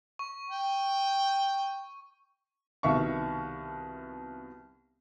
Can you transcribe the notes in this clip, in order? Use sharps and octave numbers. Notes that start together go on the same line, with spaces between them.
C#6
G5
C2 B2 D#3 E5 F5 C#6